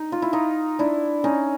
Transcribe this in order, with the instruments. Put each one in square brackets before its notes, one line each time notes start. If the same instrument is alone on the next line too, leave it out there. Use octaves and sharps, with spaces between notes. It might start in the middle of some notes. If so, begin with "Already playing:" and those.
Already playing: [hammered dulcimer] D#4
F4
E4
D#4 F4
D4 E4
C#4 D#4